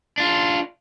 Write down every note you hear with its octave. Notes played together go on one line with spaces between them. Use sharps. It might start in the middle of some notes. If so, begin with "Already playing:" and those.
D4 F4